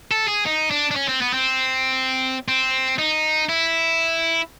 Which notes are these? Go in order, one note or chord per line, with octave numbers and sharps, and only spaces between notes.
A4
G#4
D#4
D4
D4
C#4
C4
B3
C4
C4
D#4
E4